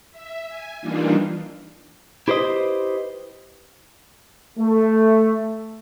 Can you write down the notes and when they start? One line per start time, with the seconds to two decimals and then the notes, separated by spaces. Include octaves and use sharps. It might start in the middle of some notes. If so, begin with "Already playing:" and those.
0.12 E5
0.48 G#5
0.81 E3 G3 A#3 D4 D#4 F4
2.28 E4 G4 B4 C5 D#5
4.58 A3